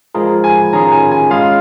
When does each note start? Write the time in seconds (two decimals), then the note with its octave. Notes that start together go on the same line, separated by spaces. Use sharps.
0.14 F3 G#3 F4 G#4 A#4
0.44 G#5
0.73 D#3 C#4 F4 G#4 A#5
0.92 G#5
1.11 G#5
1.30 G#3 C#4 F4 G#4 F5